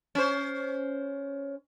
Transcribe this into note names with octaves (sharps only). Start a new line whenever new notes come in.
C#4 C5